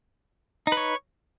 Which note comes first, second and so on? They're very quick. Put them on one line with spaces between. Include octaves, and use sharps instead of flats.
D#4 B4 C#5